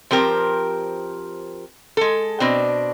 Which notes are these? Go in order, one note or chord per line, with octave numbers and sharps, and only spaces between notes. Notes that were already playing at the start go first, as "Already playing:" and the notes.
F3 C4 G4 A#4
G#3 A4
B2 C4 D4